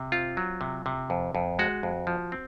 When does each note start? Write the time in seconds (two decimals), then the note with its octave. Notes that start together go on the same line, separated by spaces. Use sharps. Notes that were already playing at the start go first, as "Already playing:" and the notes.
Already playing: C3
0.12 C4 F4
0.37 F#3
0.61 C3
0.86 C3
1.10 F2
1.35 F2
1.59 G#3 F#4
1.83 F2
2.07 F3
2.32 C4